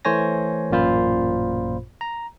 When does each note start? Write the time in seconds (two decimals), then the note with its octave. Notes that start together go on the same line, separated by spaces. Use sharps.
0.05 E3 A3 C5 C#5 G#5 A#6
0.70 A1 F#2 A#2 F4 C5 B5
2.01 A#5